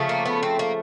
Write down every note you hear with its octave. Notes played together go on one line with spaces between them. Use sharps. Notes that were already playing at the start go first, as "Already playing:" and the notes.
Already playing: C#3 F3 A3
A#3
B3
C4
A#3